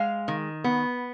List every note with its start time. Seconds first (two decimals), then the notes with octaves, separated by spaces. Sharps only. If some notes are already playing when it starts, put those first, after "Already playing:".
Already playing: G#3 F5
0.28 D#3
0.64 B3